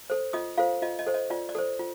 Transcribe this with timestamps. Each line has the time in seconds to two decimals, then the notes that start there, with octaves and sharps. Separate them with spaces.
0.10 A4 C5
0.33 F4 D#5 D#6
0.58 F4 A4 C5 F5
0.82 F4 D#5
0.99 D#5
1.07 A4 C5
1.14 D#5
1.30 F4 D5
1.49 D5
1.55 A4 C5
1.79 F4